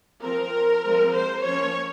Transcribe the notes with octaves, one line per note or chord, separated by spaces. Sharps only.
F3 C4 A#4
F3 G#3 C4
C5
F3 A#3 C#4 C#5